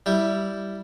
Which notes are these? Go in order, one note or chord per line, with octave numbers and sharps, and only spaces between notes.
G3 E4